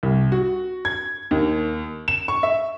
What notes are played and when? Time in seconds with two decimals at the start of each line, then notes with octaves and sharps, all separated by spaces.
0.03 C2
0.32 F#4
0.85 G#6
1.31 D#2
2.08 E7
2.28 C#6
2.43 E5